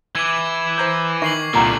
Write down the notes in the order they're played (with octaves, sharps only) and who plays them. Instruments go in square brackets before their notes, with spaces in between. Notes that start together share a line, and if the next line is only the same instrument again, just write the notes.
[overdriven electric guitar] E3 E4 [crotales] D6 G#6
[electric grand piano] C5 A#5 G6
[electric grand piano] D#3 [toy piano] E5 [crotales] C#6 C7 F#7
[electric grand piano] C2 A#2 [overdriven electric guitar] D3 G3 [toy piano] G5 A#5 E6